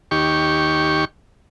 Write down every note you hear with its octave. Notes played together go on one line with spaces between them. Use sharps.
D#2 G4 C#6